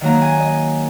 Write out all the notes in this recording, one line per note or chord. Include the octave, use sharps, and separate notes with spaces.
D#3 F#3 A#3 A#5
G#5
D#5